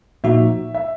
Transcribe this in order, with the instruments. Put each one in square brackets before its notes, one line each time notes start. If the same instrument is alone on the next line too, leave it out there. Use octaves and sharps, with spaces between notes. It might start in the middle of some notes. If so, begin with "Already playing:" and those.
[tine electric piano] A#2 F3 A#3 D#4 F#4 [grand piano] E5
[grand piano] E5